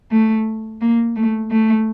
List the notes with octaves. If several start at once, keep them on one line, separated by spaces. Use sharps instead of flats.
A3
A#3
A3
A3